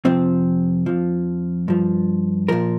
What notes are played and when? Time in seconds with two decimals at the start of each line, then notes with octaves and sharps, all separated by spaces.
0.05 F2 C3 F3 C4
0.86 F2 F3
1.68 G2 F3
2.48 A#2 F3 A#4